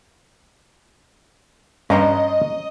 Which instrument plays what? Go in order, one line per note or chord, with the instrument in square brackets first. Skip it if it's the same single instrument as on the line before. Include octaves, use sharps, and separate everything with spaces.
[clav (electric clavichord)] G2 [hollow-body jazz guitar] C#4 A#5 C6 [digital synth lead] D#5